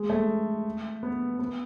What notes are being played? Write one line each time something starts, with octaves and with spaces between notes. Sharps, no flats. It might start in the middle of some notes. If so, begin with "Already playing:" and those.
Already playing: G#3
A3
B3
B3